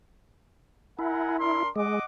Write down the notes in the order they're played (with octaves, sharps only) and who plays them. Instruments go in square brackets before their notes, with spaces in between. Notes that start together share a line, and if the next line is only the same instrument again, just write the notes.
[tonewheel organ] E4 [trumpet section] A#4 F#5 G#5
[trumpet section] D4 A#4 C6
[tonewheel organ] G#3 [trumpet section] D#5 F#5 D6